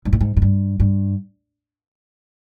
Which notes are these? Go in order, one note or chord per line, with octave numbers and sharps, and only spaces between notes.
G#2
A2
G#2
G#2
G2
G2